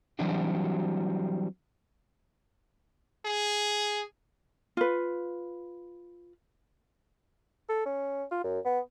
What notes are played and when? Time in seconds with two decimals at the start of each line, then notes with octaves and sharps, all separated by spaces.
0.19 E3 F#3 G3 C4 D4 F#4
3.25 G#4
4.77 F4 B4
7.69 A4
7.85 C#4
8.31 F4
8.44 F#2
8.65 B3